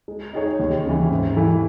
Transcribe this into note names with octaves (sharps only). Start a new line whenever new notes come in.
G#3
D#4 G#4 C#5
D#2
C#3 E3
G#2
E3 A3 E4